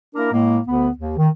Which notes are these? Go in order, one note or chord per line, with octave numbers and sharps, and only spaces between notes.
A#3 D4 E4 A#4
A2 G#3 A#3
D2 D3 B3
D#2
D#3